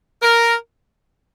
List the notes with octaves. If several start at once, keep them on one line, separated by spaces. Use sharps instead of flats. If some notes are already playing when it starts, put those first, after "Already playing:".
A#4